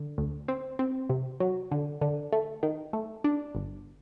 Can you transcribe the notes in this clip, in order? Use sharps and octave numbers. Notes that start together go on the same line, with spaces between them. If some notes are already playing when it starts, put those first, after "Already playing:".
Already playing: D3
D2
C4
C4
C3
F#3
D3
D3
A3
D#3
A3
D4
G1